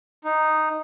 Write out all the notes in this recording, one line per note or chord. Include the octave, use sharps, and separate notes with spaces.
D#4